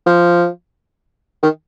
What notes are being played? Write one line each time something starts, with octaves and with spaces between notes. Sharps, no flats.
F3
D#3